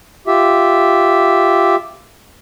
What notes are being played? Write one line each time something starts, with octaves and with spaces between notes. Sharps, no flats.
F4 G4 E5